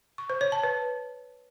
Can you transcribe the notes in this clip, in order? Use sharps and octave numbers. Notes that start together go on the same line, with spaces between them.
C#6
C5
C#5
A5
B4